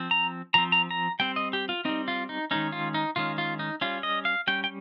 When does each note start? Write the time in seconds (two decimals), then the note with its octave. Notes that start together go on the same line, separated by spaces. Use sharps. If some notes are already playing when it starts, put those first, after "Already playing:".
Already playing: F3 C4
0.11 A#5
0.54 F3 C4 A#5
0.72 A#5
0.91 A#5
1.19 G3 C4 G5
1.36 D#5
1.53 G4
1.69 F4
1.85 G3 C4 D#4
2.08 F4
2.29 D#4
2.51 D#3 G#3 C#4 D#4
2.72 F4
2.94 D#4
3.16 D#3 G#3 C#4 F4
3.38 F4
3.59 D#4
3.81 G3 C#4 F4
4.03 D#5
4.25 F5
4.47 G3 C#4 G5
4.64 G5